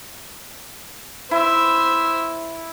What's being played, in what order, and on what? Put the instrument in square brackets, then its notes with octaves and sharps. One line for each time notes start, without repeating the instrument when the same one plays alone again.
[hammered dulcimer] E4 [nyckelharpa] C5 E5